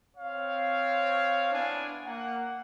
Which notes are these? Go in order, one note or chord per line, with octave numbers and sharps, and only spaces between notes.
C4 C#5 F5
B3 D4 E4 G#5
A#3 F#5